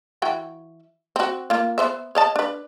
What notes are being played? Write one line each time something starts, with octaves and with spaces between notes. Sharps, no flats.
E3 F#4 G5
C4 F#4
A#3 F4
B3 C5 E5
C#5 D#5 A5
D4 B4